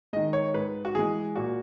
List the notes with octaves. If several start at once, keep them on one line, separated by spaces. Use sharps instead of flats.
D#3 G#3 D#5
C#5
G#2 B4
F#4
E3 G#3 G#4
A#2 F#4